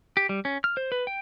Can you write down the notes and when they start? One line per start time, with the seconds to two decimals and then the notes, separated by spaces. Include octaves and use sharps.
0.17 G4
0.29 G3
0.45 C#4
0.64 F6
0.77 C5
0.92 B4
1.07 G5